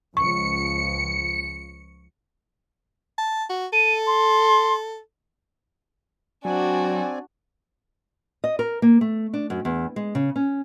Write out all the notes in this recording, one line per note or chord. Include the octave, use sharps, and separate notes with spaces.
C#2 F3 C#6 C#7
A5
F#4
A4 D#7
C6
F#3 C4 D4 F#4 D5 G#5
D#5
A#4
A#3
A3
D4
F#2
E2
G#3
C#3
C#4